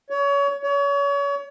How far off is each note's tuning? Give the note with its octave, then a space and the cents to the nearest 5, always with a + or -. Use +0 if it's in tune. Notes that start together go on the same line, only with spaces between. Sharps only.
C#5 +30
C#5 +35